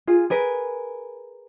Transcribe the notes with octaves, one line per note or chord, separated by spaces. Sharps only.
F4 G#4
G#4 A#4 B4